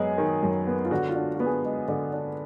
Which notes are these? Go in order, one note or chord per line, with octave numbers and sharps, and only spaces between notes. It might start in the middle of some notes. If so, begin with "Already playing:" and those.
Already playing: F#2 G#3 B3 G#4
D#3
F#2
B3
F4
D3 F#4
F4
D4
F#4
B3
G#4
G#3
D3
D4